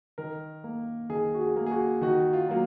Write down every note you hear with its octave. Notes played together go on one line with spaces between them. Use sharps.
D#3 A#4
A#3
D#3 G#4
F#4
G#4
A#3
G#4
F#4
D#3 F#4
F4
F#3 A#3